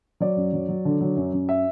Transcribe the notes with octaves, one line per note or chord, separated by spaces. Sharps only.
F#3 D5
F#2
F#3
F#3
D3
F#3
F#2
F#2
E5